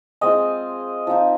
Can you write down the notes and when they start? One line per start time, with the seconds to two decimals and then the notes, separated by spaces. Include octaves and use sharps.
0.21 G#3 C4 F4 D#5
1.07 F3 C4 D#4